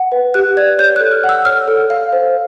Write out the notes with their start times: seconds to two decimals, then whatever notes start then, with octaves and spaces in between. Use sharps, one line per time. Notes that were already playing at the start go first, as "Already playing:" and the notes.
Already playing: F#5
0.12 B4
0.34 G4 F#6
0.57 D5 G#6
0.79 C#5 G6
0.96 A4 F#6
1.12 F6
1.24 F#5
1.29 E6
1.45 C#5 F6
1.68 A4
1.90 F5
2.12 C5